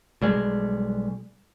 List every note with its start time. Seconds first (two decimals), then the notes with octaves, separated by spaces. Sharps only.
0.22 B1 G3 G#3